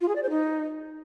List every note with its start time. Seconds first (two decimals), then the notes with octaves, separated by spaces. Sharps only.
0.01 F4
0.08 G#4
0.16 D5
0.23 C5
0.30 D#4